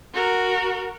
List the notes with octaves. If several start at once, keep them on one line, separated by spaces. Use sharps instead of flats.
F#4 A#4